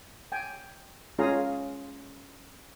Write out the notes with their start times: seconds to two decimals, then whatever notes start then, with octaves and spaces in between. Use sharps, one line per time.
0.32 G5 G#5
1.19 G#3 C#4 F4 G#4 F5 A#5